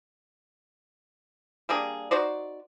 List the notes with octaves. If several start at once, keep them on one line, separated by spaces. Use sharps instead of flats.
G3 A#3 D4 G#4
D#4 F#4 C5 D5